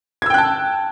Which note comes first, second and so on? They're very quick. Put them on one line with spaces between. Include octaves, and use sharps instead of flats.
G#6 E6 G5 F#6 A5